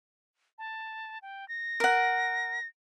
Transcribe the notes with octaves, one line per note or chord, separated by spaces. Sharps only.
A5
G5
A#6
A#4 F#5